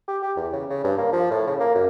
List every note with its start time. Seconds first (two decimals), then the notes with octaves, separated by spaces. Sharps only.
0.08 G4
0.23 G4
0.36 E2
0.53 C#3
0.70 C#3
0.84 G2
0.97 A#3
1.12 F3
1.31 A2
1.46 C#3
1.60 A#3
1.75 F#2